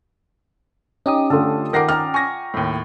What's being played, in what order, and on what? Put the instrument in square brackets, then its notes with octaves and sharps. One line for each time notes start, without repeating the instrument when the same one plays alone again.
[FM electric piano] C#4 D#6 [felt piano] D#4 [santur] G4 D#5
[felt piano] D3 A3 [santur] F4 A4
[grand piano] D#3 A#6 C7 [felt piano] A#4 F#5 D6 [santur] G#5
[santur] D5 F#5 G5 [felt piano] A#5 F6
[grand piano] G#5 A#6 [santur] C#6
[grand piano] D#2 A2